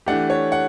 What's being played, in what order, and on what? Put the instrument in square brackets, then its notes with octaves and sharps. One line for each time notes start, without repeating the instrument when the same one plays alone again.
[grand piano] E3 A3 D4 G4 [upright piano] F#5
[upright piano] C#5
F#5